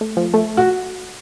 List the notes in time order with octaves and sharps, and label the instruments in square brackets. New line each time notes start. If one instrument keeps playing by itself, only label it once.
[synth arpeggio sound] A3
F3
A3
[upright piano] F#4